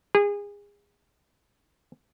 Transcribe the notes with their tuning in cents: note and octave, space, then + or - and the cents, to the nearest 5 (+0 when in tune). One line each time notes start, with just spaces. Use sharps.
G#4 -30